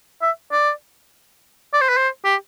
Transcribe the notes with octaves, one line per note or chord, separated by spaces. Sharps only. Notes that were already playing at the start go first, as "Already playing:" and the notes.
E5
D5
D5
C5
B4
C5
G4